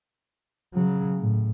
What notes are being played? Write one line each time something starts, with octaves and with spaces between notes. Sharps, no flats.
C#3 F#3
A2